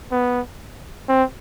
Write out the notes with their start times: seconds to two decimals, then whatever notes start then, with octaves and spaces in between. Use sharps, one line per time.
0.12 B3
1.09 C4